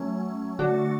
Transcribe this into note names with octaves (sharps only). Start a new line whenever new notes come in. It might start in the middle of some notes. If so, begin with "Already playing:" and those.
Already playing: F#3 A3 C#4
D3 A3 D4 F#4